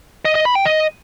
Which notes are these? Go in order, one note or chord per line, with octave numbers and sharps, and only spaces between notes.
D#5
D#5
B5
G5
D#5